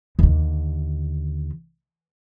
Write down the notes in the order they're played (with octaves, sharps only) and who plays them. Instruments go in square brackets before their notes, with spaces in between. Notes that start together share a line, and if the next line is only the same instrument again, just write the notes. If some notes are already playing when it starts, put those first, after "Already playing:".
[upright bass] D#2 D3